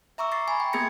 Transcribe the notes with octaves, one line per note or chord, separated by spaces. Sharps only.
E5 A#5 C#6 D6 E6
C#6 A6 A#6 C7
G#5 B5
G5
A#3 B3 G#4 G#6 A#6 C#7